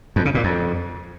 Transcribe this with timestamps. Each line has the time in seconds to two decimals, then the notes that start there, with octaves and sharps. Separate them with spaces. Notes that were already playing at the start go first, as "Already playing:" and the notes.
0.16 F2
0.25 C#3
0.35 A#2
0.44 F2